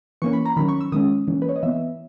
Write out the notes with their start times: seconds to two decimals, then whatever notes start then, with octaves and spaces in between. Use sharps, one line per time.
0.22 E3 A#3 C#4 C#6
0.33 B5
0.46 A#5
0.57 D#3 F#3 C#4 B5
0.69 C#6
0.81 E6
0.92 D#3 G#3 C#4 D#6
1.28 E3 A#3 C#4
1.42 B4
1.49 C#5
1.56 D#5
1.63 E3 B3 E5